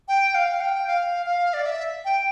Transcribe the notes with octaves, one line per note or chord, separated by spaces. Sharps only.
G5
F5
G5
F5
F5
D5
E5
G5